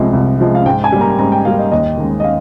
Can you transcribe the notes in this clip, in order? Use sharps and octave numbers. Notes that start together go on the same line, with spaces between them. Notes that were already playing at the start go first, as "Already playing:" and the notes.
Already playing: C2 C3 F3 G#3
C2
C3 F3 G#3
F5
G#2 G5
G#5
G3 A#3
A#5
G#2 A#5
G5
G3 A#3 F5
D#5
D#2 D#5
D#3 G#3
D#5
F5